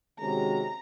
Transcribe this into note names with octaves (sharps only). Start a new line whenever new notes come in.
C3 D#3 G#3 C#4 F#4 A#5